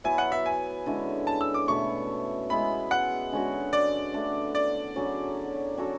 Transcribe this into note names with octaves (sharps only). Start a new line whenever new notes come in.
F#3 B3 E4 G#5
F#5
E5
G#5
D3 G#3 C#4 E4
A5
E6
D6
B2 A3 E4 C#6
G#3 B3 E4 G#4 B5
F#5
D3 G#3 C#4 F#4
D5
D3 A3 D4
D5
D3 F#3 C#4 G#4
F#3 C#4 F#4 A4